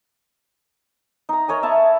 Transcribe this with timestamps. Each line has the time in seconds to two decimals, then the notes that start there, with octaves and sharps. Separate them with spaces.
1.29 D#4 A#5
1.48 A#4 C#5 D#5 G#5
1.63 E5 A5 B5